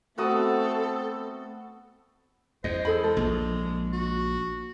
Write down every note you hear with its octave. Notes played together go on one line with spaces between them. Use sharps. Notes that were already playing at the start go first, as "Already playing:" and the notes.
A3 B3 C4 F#4 A4 D#6
E2 C5 D#5
G#4 A4 B5
G#3 A4
A#1
F#4